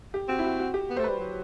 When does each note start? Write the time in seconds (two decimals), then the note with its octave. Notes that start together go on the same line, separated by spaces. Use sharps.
0.14 G4
0.29 C4 F#4
0.39 E4
0.44 F#4
0.60 F#4
0.74 G4
0.90 B3
0.97 A3 C5
1.04 G3 B4
1.19 F#3